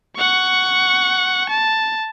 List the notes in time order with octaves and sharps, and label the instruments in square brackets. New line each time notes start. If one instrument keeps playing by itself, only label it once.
[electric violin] F#5 C#6
A5